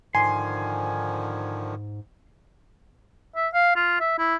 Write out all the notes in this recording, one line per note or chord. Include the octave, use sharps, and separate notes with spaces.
G#2 D3 D#3 F3 G#5 C6
E5
F5
F4
E5
E4